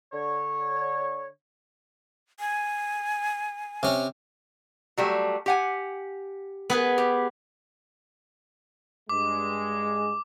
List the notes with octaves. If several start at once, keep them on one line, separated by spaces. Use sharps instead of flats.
D3 C#5
G#5
C3 C#4
F#3 G3 A3
G4 F#5 G#5
B3 G#4 B4
G4
G2 G#3 D6